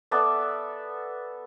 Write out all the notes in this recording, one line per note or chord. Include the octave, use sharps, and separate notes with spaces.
B3 A4 D5 E5